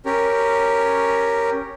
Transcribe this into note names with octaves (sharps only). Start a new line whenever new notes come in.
C#4 G4 A#4